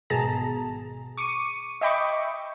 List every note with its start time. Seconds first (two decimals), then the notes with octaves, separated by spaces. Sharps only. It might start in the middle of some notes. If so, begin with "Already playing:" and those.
0.10 G#1 B2 G#4 A5 A#5
1.17 C#6 D6 C#7 D#7
1.81 D#5 E5 G5 B5 C#6 D6